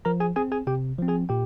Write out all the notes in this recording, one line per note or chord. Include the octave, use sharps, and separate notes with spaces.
F3 A#4 A#5
G#4 G#5
C4 G#4 G#5
G#4 G#5
C3 G4 G5
F3 C4
G#4 G#5
A#2 G4 G5